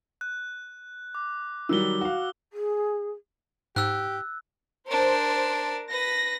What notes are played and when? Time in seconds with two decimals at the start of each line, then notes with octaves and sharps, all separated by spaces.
0.21 F#6
1.15 D6
1.69 D#3 F#3 G3 E6 G7
2.01 F#4 F5
2.53 G#4
3.76 G#2 G4 E6 F#6
4.88 D4 A#4 C5
5.91 B4 A#6